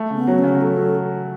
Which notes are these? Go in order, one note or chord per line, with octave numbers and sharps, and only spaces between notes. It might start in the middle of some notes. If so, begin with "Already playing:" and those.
Already playing: A3
C#3
B3
F#3
C#4
C#3
F#3 A4
F#3